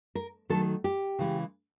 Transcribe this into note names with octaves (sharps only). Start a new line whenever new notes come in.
A#4
D#3 F#3 A3 A4
G4
C#3 E3 G#3